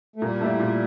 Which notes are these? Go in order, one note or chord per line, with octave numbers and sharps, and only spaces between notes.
A3
A#2 G3 A#3
A3 E4 G4 D5
A#2